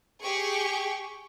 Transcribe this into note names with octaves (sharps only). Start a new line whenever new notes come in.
G4 G#4 C#6